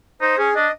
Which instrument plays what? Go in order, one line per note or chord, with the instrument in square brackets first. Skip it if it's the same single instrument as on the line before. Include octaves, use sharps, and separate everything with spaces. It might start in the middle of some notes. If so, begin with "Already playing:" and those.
[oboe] D#4 [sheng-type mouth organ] C5
[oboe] C#4 [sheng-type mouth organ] G#4
[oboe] D4 [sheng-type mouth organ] D#5